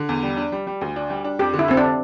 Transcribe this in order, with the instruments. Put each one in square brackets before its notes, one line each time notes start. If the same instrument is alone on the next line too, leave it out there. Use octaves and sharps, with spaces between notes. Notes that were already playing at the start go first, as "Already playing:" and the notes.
Already playing: [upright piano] D3
E2
G3
D4
G3
G3
D2
D4
G3
D4
[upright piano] F2 [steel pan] G4
[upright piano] D3
[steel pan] E4
[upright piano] F2 [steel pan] C4
[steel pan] D4